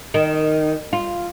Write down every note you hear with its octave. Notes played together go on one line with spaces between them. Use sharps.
D#3
F4